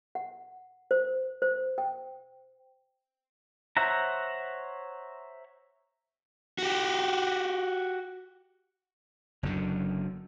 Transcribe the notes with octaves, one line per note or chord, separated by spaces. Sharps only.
F#5
C5
C5
G5
C5 C#5 E5 F#5 A#5
F#4 G4
F#1 F#2 D3